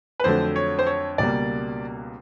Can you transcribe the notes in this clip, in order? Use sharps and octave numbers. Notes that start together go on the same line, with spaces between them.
B4
F2 D3 F#3 A3 C5
C#5
C5
C#5
C#2 B2 G3 A#3 D5